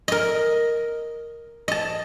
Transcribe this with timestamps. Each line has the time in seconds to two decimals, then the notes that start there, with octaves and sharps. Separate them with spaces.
0.08 A#4 D#5
1.68 D#5 A5